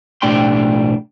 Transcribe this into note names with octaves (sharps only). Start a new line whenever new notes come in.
B1 A2 D4 G4 G5 C6